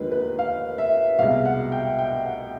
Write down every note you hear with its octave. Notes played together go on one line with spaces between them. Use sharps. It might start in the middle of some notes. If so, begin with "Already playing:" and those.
Already playing: D#2 D3 F3 G#3 A#4 B4
B4
F5
E5
C2 B2 G#3 F5
F#5
G5
G5
F#5